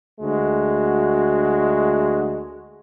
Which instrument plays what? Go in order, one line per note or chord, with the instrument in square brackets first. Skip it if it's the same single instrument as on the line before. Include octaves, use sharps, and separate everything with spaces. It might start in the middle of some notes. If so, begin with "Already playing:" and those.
[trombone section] D2 G#3 F#4